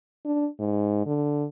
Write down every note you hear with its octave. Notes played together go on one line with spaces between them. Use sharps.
D4
G#2
D3